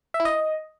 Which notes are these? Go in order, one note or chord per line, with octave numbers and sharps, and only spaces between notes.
E5
E4
D#5